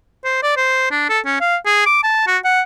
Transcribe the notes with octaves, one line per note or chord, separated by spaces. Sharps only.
C5
D5
C5
D4
A4
C#4
F5
G#4
D6
A5
F#4
F#5